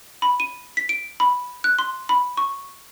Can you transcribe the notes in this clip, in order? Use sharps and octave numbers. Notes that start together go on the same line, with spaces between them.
B5
D#7
B6
D7
B5
F#6
C6
B5
C#6